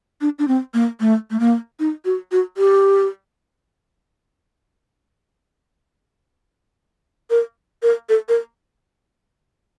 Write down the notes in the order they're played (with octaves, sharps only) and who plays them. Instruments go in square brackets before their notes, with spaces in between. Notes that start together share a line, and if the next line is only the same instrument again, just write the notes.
[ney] D4
D4
C4
A#3
A3
A3
A#3
D#4
F#4
F#4
G4
A#4
A#4
A4
A#4